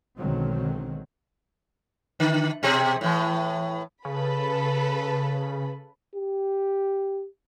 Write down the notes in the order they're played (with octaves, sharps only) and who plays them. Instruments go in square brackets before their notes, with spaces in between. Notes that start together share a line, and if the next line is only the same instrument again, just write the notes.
[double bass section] B1 D3 D#3 F#3 G#3 C4
[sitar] D3
B2 C4 G#4
A2 E3
[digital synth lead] C#3 [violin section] A4 B4 B5
[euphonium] G4